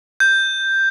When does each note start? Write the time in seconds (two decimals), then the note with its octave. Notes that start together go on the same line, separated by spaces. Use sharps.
0.20 G6